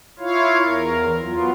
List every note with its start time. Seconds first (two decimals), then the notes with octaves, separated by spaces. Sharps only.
0.19 E4 F4 C#5 F5
0.64 E2 A#4
1.21 F#3 B3 F4